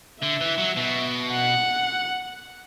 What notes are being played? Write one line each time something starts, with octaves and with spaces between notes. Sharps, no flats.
D3 E5
E3
F#3
B2
F#5